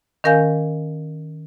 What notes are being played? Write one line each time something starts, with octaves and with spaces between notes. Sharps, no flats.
D#3 C#4 A#4 F5 G#5 G6